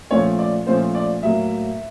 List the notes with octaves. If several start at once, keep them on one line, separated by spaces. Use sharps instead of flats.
A#2 F3 A3 C#4 C#5
D5
A#2 F3 A3 C#4 C5
D5
A2 F#3 A#3 E5